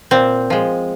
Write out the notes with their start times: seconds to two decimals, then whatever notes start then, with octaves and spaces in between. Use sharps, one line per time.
0.11 A#2 C4
0.50 F3 G#3